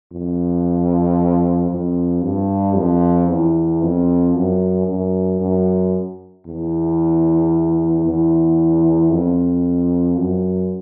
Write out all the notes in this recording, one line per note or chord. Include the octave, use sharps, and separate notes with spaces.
F2
F2
G2
F2
E2
F2
F#2
F#2
F#2
E2
E2
F2
F#2